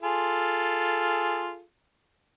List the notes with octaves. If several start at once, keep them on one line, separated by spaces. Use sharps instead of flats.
F4 G#4 A4